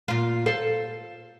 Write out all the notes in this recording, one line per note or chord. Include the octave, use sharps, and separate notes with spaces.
A#2 F4
A4 C5 F5